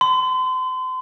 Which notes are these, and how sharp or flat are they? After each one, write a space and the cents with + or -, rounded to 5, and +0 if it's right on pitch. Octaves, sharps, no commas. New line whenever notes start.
C6 -35